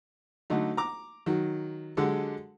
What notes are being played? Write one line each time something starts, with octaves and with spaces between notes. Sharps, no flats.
D3 F#3 A3 D#4
A#5 D6
D#3 F#3
D3 F#3 G#3 G4 A4